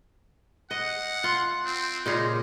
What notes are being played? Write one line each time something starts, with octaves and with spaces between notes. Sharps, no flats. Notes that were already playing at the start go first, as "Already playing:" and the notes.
D#5 F#5
F4
C4
A#2 C#3 G#3 D#4